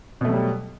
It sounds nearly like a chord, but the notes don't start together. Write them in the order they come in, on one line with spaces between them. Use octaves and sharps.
B2 A3 F#3 G3